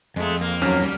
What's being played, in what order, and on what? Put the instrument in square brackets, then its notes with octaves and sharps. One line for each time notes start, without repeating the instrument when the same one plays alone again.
[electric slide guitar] F2 [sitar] G#3 A3
[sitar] A#3
[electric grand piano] D#2 C#4 F6 [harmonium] F#3
[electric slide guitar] G3